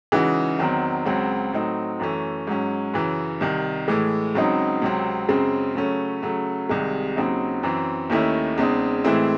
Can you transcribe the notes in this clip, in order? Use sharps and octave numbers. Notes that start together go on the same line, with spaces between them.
C#3 E3 G#3 D#4 F#4
E2 D#3 F#3 C4
C#2 C#3 F#3 C4 F#4
A2 F#3 C4 D#4
F#2 E3 A3 C#4
G#2 F#3 C#4
F#2 C#3 E3
C2 C3 D#3
A2 E3 G#3
C#2 C#3 F#3 C4 D#4
C#2 C3 F#3 C4
F#2 C#3 G#3 C4
C#3 F#3 A3 C#4
C#3 F#3 A3
C2 C3 D#3 G#3
D#2 C#3 F#3 C4 D#4
F#2 E3 C4
D#2 D#3 A3 C#4 E4
E2 C#3 G#3 C4 D#4
A2 E3 G#3 C4 E4